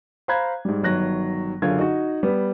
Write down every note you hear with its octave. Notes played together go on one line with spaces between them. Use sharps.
C5 F5 A#5 B5 F#6 G#6
G#2 G3
G1 D#3 F#3 F#6 A#6
F#1 D3 F#3 F4 G#4 G#6
D#4 F#4
G3 B3